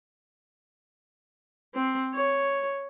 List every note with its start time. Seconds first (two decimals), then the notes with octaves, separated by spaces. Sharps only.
1.75 C4
2.14 C#5